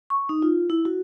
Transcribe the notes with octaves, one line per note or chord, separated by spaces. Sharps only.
C#6
D#4
F4
E4
F#4